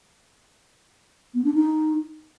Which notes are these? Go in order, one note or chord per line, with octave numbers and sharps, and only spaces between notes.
B3
D4
D#4